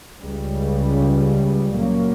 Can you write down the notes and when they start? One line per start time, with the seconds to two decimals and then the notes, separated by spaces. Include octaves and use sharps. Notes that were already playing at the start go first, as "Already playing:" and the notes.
0.21 C#2 C#3 G3
1.77 A#2 F#3 A#3 C#4